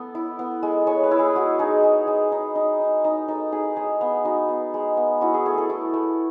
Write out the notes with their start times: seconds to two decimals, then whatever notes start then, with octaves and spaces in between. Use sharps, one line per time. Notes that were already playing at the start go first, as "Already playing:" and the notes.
Already playing: B3 A4
0.15 E4
0.39 B3
0.63 G#3
0.87 G#3 C#5
1.04 B4
1.11 E4
1.19 G#4
1.35 G#3 F#4
1.59 D#4 G#4
1.84 G#3
2.07 G#3
2.32 D#4
2.56 D#4
2.80 D#4
3.04 D#4
3.28 D#4 A4
3.52 D#4 G#4
3.76 G#3 G#4
4.01 B3
4.25 D#4 F#4
4.49 B3
4.74 G#3
4.97 B3
5.21 E4 F#4
5.34 G#4
5.46 A3 G#4
5.58 A4
5.70 E4
5.94 A3